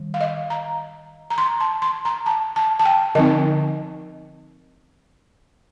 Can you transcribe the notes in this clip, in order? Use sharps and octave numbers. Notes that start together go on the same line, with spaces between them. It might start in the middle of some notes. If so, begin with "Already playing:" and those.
Already playing: D#3 G3
F5
D#5
A#5
A#5
C6
A5
C6
A#5
A5
A5
A5
G5
D3 F3 C4 D#4 D#5